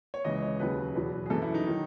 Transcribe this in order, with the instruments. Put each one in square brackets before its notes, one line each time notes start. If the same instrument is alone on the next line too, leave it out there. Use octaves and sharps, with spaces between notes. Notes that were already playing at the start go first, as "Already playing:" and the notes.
[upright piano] C#5
C#2 C#3 E3 D#5
C#5
D#2 C#3 F#3 B4
E2 B2 F#3
G#4
F#2 E3 A4
E4
D#4
D#3 F#3